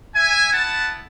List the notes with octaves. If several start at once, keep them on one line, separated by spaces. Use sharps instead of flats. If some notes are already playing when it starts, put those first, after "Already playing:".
E5 G#5
B3 E4 F#5 A5